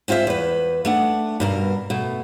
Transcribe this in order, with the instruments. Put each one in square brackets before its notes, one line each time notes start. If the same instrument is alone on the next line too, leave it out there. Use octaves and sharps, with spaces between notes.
[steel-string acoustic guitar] G#3 C4 F4 C5 E5
E2 B4
A3 D4 F#5
G2 B2 A#4
B2 A3